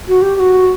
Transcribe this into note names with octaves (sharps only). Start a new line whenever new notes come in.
F#4
G4
G4
F#4